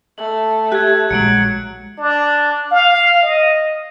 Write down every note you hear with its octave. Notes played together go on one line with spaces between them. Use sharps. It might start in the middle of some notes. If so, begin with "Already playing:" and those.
A3 F#7
G4 F#6 G#6
A#1 D#3 F#3 G#3 C#7 D7 F#7
D4
F5
D#5